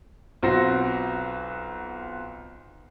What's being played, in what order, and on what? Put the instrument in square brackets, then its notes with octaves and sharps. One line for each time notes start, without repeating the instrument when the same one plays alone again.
[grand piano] B1 C4 F4 F#4 A#6